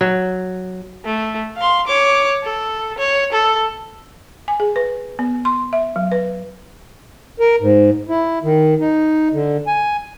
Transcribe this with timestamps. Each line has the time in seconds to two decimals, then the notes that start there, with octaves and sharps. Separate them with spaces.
0.01 F#3
1.05 A3
1.57 F5 C6
1.87 C#5 D6
2.43 A4
2.98 C#5
3.32 A4
4.48 G#5
4.60 G#4
4.76 B4
5.19 B3
5.45 C6
5.73 E5
5.96 F#3
6.12 B4
7.40 A#4
7.60 G#2
8.09 E4
8.43 D#3
8.80 D#4
9.33 D3
9.67 G#5